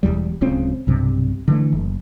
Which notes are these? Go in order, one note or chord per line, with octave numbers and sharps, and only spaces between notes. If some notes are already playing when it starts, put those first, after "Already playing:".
E1 A1 E2 G3
D1 C#2 C#3 C4
B1 G2 C3
D3 E3 A3
F#1